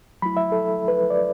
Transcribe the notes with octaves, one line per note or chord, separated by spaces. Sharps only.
F#3 A3 E4 B5
E5
A4
B4
D5